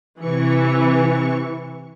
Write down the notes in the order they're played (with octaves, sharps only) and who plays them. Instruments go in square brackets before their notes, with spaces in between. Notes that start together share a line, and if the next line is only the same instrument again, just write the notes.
[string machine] C3 C#6 C#7 [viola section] E3